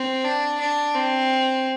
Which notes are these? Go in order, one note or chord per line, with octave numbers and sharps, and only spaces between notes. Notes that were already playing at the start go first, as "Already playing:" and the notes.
Already playing: C4
D4
D4
C4